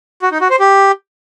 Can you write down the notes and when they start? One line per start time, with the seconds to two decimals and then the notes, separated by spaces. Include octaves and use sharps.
0.22 F#4
0.32 D#4
0.41 F#4
0.50 C5
0.60 G4